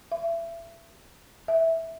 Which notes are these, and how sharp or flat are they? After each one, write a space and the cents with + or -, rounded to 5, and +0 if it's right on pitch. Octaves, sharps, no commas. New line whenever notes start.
E5 +30
E5 -10